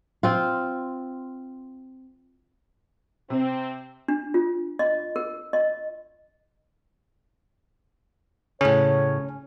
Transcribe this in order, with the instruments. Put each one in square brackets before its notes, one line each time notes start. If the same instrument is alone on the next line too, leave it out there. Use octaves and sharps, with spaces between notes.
[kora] C4 F4
[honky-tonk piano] C3 [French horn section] C4
[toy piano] D4
F4
D#5
A#4
D#5
[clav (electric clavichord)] A2 C#3 [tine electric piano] C#4 [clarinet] C#5